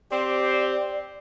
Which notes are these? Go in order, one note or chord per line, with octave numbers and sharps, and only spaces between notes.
C4 G4 C5 D5